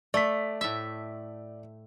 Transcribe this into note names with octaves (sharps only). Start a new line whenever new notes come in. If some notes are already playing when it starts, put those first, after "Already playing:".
A3 D5 B6
A2 E5